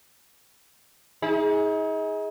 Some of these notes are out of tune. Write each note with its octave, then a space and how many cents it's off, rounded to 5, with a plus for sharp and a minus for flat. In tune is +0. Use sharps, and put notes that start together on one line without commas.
D#4 +40 G#4 +0